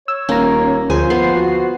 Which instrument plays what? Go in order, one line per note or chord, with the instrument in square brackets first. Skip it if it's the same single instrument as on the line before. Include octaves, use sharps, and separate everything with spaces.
[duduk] C#5 [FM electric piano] E6
[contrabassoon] D#1 [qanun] A#3 [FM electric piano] C#4 A#5
[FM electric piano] D2 G#4 [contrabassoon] F3 [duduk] C5 [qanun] G#5
[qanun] B3 [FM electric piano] C7
[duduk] F#4